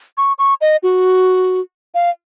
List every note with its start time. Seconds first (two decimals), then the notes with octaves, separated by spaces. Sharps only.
0.17 C#6
0.39 C#6
0.61 D#5
0.83 F#4
1.95 F5